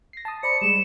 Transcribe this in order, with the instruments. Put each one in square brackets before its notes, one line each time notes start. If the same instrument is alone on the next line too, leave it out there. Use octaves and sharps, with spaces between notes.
[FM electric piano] A#6 C7
A5 D#6
[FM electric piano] C5 D5 B5 [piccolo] C#7
[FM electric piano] G3 G#3 [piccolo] E7